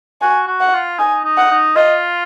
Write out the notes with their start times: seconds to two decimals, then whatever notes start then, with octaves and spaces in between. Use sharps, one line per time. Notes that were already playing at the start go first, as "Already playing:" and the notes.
0.22 F#4 G#5
0.47 F#4
0.60 F#5
0.73 F4
0.99 D#4 G#5
1.24 D#4
1.38 F#5
1.50 D#4
1.76 F4 D#5